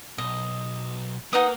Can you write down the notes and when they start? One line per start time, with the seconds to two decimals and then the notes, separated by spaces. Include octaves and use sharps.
0.18 B1 D#5
1.33 A#3 D#4 B4 F#5 D#6